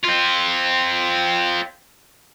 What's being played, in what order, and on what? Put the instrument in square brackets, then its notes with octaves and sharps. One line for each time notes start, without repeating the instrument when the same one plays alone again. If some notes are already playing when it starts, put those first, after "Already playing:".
[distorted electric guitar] C4 F4